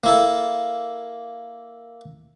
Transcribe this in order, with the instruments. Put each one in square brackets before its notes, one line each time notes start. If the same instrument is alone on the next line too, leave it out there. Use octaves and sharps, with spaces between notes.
[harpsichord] A#3 E4 A4